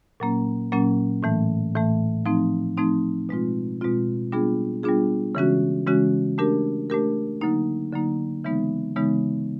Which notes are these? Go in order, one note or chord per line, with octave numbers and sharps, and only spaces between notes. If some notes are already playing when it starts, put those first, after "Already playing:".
A#2 F#3 A#3 C#4
A#2 F#3 A#3 C#4
A2 E3 A3
A2 E3 A3
F3 A3 C4 D#4
F3 A3 C4 D#4
B2 G#3 C4 F4
B2 G#3 C4 F4
G3 B3 D4 F4 G#4
G3 B3 D4 F4 G#4
C#3 E3 G#3 C#4 F#4
C#3 E3 G#3 C#4 F#4
A3 D4 G4 A#4
A3 D4 G4 A#4
D3 F#3 A#3 D#4
D3 F#3 A#3 D#4
C#3 E3 G#3 B3 D#4
C#3 E3 G#3 B3 D#4